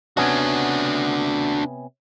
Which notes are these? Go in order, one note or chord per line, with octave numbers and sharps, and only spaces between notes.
C3 B3 C#4 D4 F#4